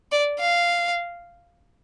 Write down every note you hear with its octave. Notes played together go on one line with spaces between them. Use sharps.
D5
F5